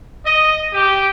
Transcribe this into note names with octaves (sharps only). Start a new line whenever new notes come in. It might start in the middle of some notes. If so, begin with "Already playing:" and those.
D#5
G4